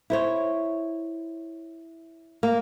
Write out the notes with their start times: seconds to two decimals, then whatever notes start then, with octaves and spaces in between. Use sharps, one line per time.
0.10 E4 C5 C#5
2.43 A#3